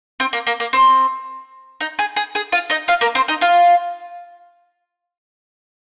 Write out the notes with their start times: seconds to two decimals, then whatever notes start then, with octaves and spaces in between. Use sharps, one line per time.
0.20 C4
0.33 A#3
0.47 A#3
0.60 A#3
0.73 C4
1.81 D#4
1.99 G#4
2.16 G#4
2.35 G#4
2.52 F4 F5
2.70 D#4 D#5
2.88 F4 F5
3.01 A#3 A#4
3.15 C4 C5
3.28 D#4 D#5
3.41 F4 F5